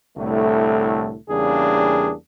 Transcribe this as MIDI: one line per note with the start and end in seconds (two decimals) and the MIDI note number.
0.18 1.17 36
0.18 1.17 45
0.18 1.17 50
0.18 1.17 57
1.30 2.14 40
1.30 2.14 49
1.30 2.14 55
1.30 2.14 58
1.30 2.14 62
1.30 2.14 68